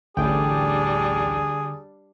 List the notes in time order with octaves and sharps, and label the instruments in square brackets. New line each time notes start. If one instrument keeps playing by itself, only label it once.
[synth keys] A1 D2 G5 [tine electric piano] D3 [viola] G3 D4 [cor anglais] G#4